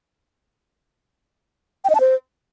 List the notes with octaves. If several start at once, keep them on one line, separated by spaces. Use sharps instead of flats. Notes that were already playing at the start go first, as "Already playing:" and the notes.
G5
D#5
A5
C5